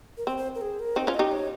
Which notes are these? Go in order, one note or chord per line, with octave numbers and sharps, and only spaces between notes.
A#4
C4 C5
C5
A#4
G#4
A#4
C4 D#4 C5
C#4 F4
D#5
D#4 G4
C#5